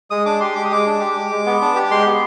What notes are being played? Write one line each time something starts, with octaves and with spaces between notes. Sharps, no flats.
G#3 D#6
D4 D6
G4 C6
G#3 D6
D#6
G#3 D6
D4
G4
G#3
G#3
B3
D4
G4
G#3 C6
B3